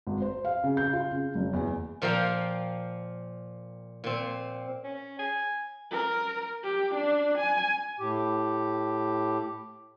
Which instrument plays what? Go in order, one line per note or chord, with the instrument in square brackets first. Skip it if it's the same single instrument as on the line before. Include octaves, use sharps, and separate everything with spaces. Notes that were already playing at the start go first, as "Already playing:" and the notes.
[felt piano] G#1
C5
F5
C#3
G6
F4
C#3
F#1
E2
[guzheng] A#2 F3 A#4 F5 G5
A#2 C4
[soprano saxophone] C#4
G#5
[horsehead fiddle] A#4
G4
D4
G#5
[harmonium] A2 G4